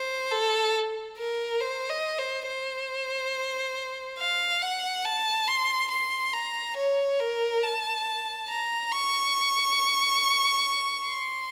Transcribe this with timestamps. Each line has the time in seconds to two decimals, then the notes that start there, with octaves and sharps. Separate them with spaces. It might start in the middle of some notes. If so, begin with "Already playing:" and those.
Already playing: C5
0.31 A4
1.18 A#4
1.60 C5
1.89 D#5
2.18 C5
2.47 C5
4.19 F5
4.62 F#5
5.05 A5
5.48 C6
5.91 C6
6.33 A#5
6.77 C#5
7.20 A#4
7.63 A5
8.49 A#5
8.91 C#6
11.07 C6